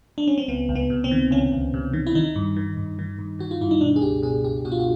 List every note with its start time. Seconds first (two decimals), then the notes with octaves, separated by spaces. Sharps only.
0.18 D4
0.28 C#4
0.38 C4
0.48 C#2 B3
0.69 C#2
0.75 B3
0.90 C3
1.04 C4
1.11 D#3
1.31 C#2 C#4
1.52 C#2
1.74 C3
1.93 D#3
2.07 E4
2.15 D#3 D#4
2.36 G2
2.56 D#3
2.77 G2
2.99 D#3
3.19 G2
3.39 D#3 F#4
3.51 F4
3.61 G2 E4
3.71 D#4
3.81 B2 D4
3.96 G#4
4.02 C#2 G4
4.22 B2 G#4
4.45 C#2 G4
4.65 B2 F#4
4.72 F4
4.80 F#4